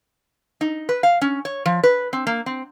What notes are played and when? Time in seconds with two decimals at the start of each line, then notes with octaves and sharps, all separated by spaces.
0.61 D#4
0.89 B4
1.03 F5
1.21 C#4
1.45 C#5
1.66 F3
1.84 B4
2.13 C4
2.27 A#3
2.46 C4